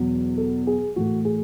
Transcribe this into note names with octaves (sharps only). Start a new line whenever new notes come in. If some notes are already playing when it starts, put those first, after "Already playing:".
Already playing: E2 B2 F#3
A4
G#4
A2 E3 A3 F#4
G#4